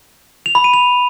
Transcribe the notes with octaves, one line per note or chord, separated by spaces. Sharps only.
F7
B5
D#7
F7